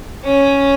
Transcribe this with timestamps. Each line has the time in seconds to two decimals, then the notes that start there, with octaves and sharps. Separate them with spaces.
0.24 C#4